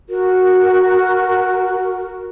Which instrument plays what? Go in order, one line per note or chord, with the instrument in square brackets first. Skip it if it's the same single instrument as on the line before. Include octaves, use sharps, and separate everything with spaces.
[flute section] F#4 A#4